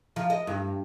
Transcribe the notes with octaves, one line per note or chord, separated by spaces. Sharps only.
F3
D#5
G2